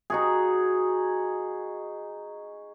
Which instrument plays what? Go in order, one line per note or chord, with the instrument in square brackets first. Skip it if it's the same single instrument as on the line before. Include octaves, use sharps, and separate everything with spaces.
[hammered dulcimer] D#4 F#4 G#4